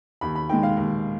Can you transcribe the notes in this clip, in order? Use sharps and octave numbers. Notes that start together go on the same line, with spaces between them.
D#2 B5
B5
D#3 G#3 G5
F5
D#2